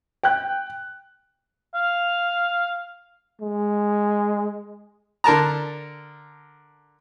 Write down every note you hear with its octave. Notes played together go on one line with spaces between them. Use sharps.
G5 F#6
F5
G#3
D3 A#4 A5 A#5